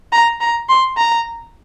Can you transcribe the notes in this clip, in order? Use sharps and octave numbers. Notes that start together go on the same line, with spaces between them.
A#5
A#5
C6
A#5